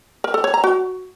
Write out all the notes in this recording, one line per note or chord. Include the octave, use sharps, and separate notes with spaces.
A#4
A4
C#5
A#5
F#4